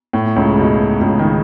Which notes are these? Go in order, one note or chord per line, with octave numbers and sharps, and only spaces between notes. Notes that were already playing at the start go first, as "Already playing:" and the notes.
A2
C#2 C#3
B2
C#2 C#3
D#3